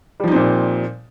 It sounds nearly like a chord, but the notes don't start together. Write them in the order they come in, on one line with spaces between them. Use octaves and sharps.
G3 F3 D#4 C4 A#2